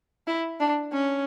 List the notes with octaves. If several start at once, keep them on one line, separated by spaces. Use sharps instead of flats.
E4
D4
C#4